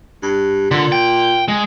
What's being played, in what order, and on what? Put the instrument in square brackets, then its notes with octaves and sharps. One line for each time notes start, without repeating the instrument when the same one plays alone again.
[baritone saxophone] G2
[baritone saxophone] A#2 [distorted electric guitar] D3
[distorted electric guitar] G5
G#3